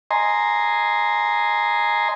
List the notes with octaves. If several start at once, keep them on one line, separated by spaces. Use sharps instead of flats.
D#5 G#5 A#5 C6